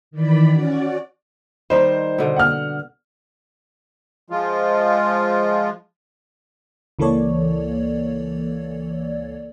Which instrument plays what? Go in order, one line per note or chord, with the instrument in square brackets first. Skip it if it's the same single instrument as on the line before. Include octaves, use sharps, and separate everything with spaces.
[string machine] D#3 E3 D5 B5
C#4 F#4 D5
[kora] D#3 G3 D#4 [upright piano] C5
[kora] B2 D3
[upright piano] F#5 F6
[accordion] F3 G#3 F4
[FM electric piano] C#2 E3 A#3 A4 C#5 D5